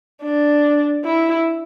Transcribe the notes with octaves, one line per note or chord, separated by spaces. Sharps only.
D4
E4